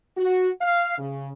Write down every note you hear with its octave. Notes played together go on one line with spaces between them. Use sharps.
F#4
F5
C#3